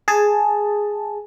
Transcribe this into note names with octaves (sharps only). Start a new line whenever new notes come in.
G#4 A5